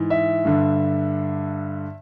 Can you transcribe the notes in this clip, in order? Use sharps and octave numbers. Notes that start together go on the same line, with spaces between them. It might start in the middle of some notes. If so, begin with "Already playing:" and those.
Already playing: G#2 E3
E5
G2 D3